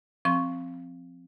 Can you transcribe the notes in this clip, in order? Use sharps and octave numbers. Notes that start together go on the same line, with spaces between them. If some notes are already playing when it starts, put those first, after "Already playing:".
F3 C4 C#6